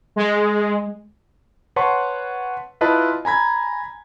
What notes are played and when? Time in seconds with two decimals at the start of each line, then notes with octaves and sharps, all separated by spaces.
0.16 G#3
1.76 B4 C#5 F#5 A5 C6 C#6
2.81 E4 F4 B4 D#5 A5
3.25 G#5 A#5 B5 G#6